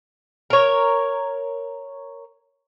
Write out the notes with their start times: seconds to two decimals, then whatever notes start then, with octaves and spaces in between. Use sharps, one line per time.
0.50 A#4 C#5